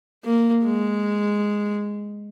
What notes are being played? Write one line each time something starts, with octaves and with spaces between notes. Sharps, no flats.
A#3
G#3